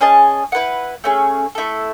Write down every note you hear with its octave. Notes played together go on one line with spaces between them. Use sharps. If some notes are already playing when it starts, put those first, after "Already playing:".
C#4 G#4 D#5 A5
E4 B4 F#5
A3 C#4 G#4
A3 E4 A4